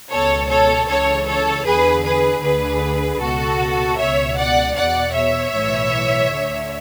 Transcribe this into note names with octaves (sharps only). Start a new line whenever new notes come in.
C#2 B2 A4 C#5
A4 C#5
C#2 C#3 E3 A4 C#5
A4 C#5
E2 D3 G#4 B4
G#4 B4
D2 D3 G#4 B4
C#2 B2 F#4 A4
C#2 B2 C#5 E5
D5 F#5
E2 B2 D5 F#5
C#5 E5
B1 A2 E3
D2 D3